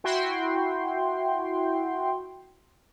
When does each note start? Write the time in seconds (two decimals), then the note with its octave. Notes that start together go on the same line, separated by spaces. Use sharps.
0.04 E4 F#4 G5 C6